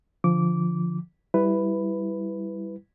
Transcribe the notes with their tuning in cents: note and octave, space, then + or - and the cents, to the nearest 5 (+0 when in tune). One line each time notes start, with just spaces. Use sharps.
D3 +0 F3 -10 D6 -15
G3 +0 E4 +0 B4 +5